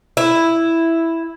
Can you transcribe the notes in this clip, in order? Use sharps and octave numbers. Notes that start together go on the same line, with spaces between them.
E4